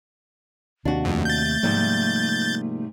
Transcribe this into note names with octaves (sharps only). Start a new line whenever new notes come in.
D#2 C3 D4 F#4
F2 A3
G6 A6
G#2 C3 F3 G3 A#3